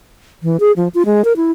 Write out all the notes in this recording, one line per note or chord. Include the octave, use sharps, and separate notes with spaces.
E3
G#4
F3
F4
G#3
A#4
E4